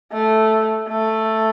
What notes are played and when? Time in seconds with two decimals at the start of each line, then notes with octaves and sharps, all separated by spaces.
0.12 A3
0.89 A3